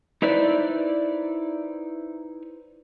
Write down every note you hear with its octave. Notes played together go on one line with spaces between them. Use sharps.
D#4 E4 B4 C5 D5